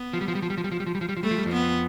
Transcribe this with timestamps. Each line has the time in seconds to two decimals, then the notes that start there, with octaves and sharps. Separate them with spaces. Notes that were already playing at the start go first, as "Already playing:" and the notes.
Already playing: B3
0.13 F3
0.21 G3
0.28 F3
0.35 G3
0.42 F3
0.50 G3
0.58 F3
0.64 G3
0.72 F3
0.80 G3
0.86 F3
0.95 G3
1.01 F3
1.09 G3
1.17 F3
1.23 G3 A3
1.31 F3
1.38 G3
1.46 F2 F3
1.53 B3